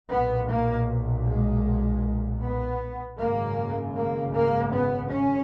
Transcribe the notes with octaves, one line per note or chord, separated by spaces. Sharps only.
B1 A#2 B3
A#3
G#3
B3
G#1 F#2 C#3 A#3
A#3
A#3
B3
C#4